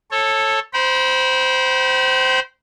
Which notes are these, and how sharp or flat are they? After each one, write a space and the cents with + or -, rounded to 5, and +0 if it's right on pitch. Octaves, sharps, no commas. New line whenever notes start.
A4 +0 C#5 -20
C5 -10 G5 -35 B5 -40